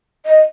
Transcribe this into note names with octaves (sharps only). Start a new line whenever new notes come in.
D#5